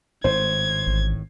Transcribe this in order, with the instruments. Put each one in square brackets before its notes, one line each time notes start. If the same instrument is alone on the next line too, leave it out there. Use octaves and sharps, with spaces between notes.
[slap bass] G#1 A2 [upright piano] C5 [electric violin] G#6
[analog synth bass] A1